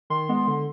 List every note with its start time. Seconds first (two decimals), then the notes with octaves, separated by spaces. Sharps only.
0.10 D#3 C6
0.29 G#3 B3
0.47 D3